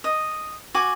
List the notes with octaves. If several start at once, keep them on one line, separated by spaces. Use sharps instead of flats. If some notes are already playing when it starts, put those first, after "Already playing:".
D#5
F#4 G#5 D6